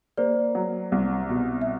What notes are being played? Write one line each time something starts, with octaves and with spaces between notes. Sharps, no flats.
A#3 C5 D5
F#3
C2
B2
E5